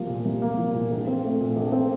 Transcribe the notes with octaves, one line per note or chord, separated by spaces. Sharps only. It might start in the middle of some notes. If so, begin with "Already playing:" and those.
Already playing: C2 F3 A#3
A#2
C2
A#3
F3
A#2
A#1
C4
A3
A#2
A#1
C4